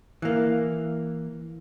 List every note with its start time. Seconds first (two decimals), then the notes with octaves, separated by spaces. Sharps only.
0.22 E3 A#3